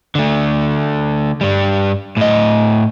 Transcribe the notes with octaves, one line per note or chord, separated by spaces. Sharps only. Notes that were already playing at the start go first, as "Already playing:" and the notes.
D3 A3
G2 G3
A2 D#5